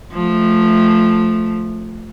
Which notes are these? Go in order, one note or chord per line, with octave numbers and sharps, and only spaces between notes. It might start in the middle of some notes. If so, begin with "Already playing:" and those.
F3 A3